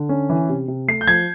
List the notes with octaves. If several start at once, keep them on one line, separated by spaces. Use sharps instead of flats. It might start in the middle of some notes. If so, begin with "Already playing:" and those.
Already playing: D3
C#4
E3
C3
C3
A3 C7
G6
F3 G#6